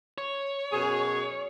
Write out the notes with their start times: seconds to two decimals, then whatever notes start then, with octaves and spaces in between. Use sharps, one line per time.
0.18 C#5
0.72 F#2 B2 G#4